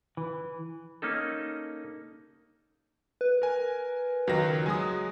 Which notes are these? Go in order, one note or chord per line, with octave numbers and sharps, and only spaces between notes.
E3
A#3 C#4 D#4 A4
B4
A#4 G#5
C#2 D#3 F#3 A#6
F#3 G#3 G#5 D#6